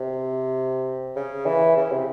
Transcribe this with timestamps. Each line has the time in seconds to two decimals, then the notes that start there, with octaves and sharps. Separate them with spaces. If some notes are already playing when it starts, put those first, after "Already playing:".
Already playing: C3
1.16 C#3
1.46 E3
1.77 C#3
1.91 C3